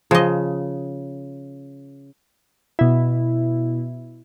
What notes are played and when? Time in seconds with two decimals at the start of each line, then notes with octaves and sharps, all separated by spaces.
0.11 C#3 F3 D#5
2.79 B2 E4